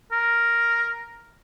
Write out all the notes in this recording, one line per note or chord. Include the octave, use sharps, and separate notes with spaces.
A#4